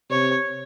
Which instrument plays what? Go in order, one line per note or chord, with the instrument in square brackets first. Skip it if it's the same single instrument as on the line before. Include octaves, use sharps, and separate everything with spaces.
[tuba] C3 [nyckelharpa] C#5